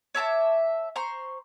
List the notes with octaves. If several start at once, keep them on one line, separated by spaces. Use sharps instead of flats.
C#5 E5 A5 D6
C5 A#5 C6 C#6